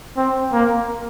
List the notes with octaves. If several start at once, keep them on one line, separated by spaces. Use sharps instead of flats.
C4
A#3